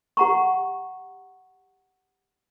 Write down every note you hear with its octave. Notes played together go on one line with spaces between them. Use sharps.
G4 F#5 A#5 C#6